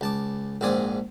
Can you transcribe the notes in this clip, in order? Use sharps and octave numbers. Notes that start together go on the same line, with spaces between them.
C#2 A5 D6
A#1 G#2 C4 D5 G#5 D#6